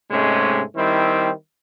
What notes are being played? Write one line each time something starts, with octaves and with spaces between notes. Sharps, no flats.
G#2 C3 G#3 A3 C#4
D#3 G3 C4 E4